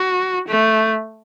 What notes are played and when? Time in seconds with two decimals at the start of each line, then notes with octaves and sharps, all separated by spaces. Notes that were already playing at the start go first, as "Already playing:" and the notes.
Already playing: F#4
0.48 A3